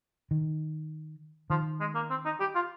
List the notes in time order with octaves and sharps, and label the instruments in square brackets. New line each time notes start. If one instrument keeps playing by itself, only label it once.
[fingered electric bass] D#3
[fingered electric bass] D#3 [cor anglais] F3
[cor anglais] G#3
A#3
C4
D#4
G4
F4